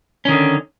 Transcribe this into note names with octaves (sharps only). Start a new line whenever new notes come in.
D3 D#3 C#4